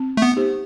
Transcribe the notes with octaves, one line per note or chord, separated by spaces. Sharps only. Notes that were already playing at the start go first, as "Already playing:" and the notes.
Already playing: C4
A3
B3
D#4 G4 C5